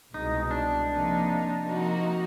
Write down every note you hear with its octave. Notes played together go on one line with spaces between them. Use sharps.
C2 B2 G#3 D#4
D4
C3 F3 A#3 D#4
C3 F3 A#3 D#4 F#4